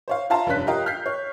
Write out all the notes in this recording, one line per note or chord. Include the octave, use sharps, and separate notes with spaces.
C5 C#5 F5
F4 E5 F5 A5 A#5 C6
F1 G2 C#4 F#6 B6
F4 G4 A#4 D#5 F5 G5
F6 G6 B6 C7
C#5